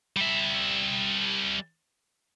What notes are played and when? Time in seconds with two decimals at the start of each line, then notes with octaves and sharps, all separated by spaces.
0.17 G3 E5